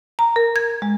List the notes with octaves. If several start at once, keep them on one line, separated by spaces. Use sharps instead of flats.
A#5
A#4
G#6
G#3